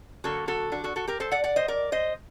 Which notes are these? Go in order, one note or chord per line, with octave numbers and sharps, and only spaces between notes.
D3 F#3 A#3 F#4 A4
F#4 A4
D4 F#4
F#4 A4
F#4 A4
G4 A#4
A4 C5
D5 F#5
D5 F#5
C5 D#5
A#4 D5
C5 D#5